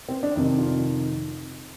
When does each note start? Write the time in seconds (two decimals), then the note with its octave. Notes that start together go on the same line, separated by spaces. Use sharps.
0.09 C4
0.23 D4
0.36 F2 C3 D#3 D#4
0.58 F4